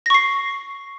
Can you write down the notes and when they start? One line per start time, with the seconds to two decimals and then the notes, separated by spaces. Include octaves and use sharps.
0.06 A#6
0.10 C#6
0.14 C7